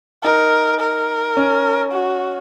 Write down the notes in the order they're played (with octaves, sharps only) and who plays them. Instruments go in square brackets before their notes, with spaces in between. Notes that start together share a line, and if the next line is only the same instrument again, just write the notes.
[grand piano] D#4 [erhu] A#4
[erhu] A#4
[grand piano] C#4
[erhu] F#4